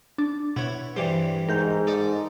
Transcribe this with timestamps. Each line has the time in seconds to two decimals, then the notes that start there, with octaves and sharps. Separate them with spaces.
0.18 D4
0.56 B2 E4 C#5
0.96 G2 E3 G3 C5 D5
1.49 G#2 A#4 G6
1.87 A4 D5 D#5